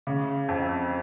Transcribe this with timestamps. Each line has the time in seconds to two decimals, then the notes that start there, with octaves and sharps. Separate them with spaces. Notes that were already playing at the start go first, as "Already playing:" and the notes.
0.07 C#3
0.49 F2